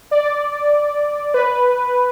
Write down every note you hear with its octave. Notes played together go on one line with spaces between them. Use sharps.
D5
B4